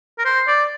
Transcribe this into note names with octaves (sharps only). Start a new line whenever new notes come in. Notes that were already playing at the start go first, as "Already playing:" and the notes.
A#4
C5
D5